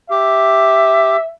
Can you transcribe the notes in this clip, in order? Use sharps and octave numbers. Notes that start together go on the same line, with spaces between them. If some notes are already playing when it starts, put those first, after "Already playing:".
G4 E5